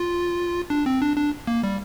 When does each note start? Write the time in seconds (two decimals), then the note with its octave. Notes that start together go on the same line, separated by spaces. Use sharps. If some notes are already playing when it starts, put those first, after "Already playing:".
Already playing: F4
0.70 D4
0.86 C4
1.02 D4
1.17 D4
1.47 A#3
1.63 G3